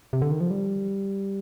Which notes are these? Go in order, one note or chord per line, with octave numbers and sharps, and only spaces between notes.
C3
D3
D#3
F3
G3